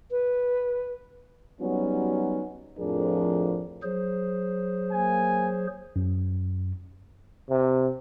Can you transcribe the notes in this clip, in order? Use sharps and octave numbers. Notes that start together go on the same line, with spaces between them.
B4
F#3 G3 B3 C#4 D#4 F#4
F2 A2 F3 D4 G#4 A#4
F#3 G#4 C5
A#3 G#5
F#2
C3